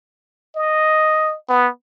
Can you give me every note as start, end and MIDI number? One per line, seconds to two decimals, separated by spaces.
0.55 1.35 75
1.49 1.68 59